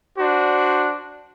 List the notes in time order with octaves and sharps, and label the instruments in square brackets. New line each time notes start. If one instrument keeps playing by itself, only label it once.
[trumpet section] D4 F#4 C5